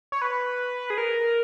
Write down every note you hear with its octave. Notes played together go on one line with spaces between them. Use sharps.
C#5
B4
G#4
A#4